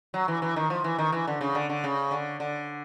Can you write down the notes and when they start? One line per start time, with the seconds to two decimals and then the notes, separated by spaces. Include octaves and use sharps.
0.14 F#3
0.28 E3
0.42 E3
0.56 D#3
0.70 F3
0.84 E3
0.99 D#3
1.12 E3
1.28 D3
1.41 C#3
1.55 D3
1.69 D3
1.84 C#3
2.11 D3
2.40 D3